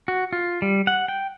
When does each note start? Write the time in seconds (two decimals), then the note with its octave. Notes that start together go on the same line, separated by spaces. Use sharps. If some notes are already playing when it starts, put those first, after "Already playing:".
0.08 F#4
0.33 F4
0.62 G3
0.87 F#5
1.08 G5